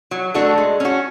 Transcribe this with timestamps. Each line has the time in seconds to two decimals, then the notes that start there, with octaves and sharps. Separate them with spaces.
0.11 F#3
0.34 A3 D4 F#4 A4
0.58 G#3
0.80 C#4 F#4